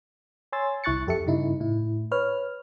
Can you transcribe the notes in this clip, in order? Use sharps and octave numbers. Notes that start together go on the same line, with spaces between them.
C#5 G#5 C6 E6 A6
C2 E4 C#6 F#6 A6 C#7
F2 G4 A4 E5 C#7
G2 C#3 D#4 E4
A2 E4
B4 C#5 F6